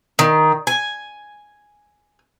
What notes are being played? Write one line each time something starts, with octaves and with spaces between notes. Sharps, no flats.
D#3
G#5